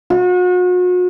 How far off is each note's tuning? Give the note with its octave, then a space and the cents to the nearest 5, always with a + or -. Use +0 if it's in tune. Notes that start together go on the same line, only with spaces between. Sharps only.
F#4 -40